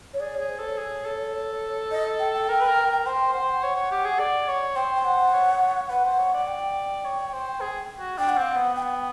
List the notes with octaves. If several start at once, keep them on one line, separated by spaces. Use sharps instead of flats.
C#5
G#4 D5
G#4 C#5
C5
A4 C#5
G#4
A4
D#5
G5
G5
A#4
B4
A#4
A#4
C5 G5
C5 F#5
G5
F#5
C#5
C#5
G4
G#4
D5
C#5
C5 G5
G5
F#5
C#5
C#5
B4 F#5
C5
C#5
D5
G5
C#5
C5
G#4
F#4
D4 G5
F#5
C4 F5
B3 F#5
G5
F#5
G5